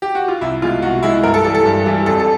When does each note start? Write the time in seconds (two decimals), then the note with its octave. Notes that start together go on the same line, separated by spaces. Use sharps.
0.02 G4
0.15 F#4
0.28 F4
0.41 C2 E4
0.62 B2 G#3 F4
0.82 C2 F#4
1.03 B2 G#3 E4
1.23 G2 A#4
1.34 A4
1.44 E3 G3 A4
1.55 A4
1.66 G2
1.86 E3 G3
2.06 F2 A4
2.20 A4